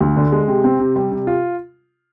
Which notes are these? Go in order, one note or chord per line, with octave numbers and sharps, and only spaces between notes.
D2
D3
G#3
C3
C4
C3
G3
C3
F4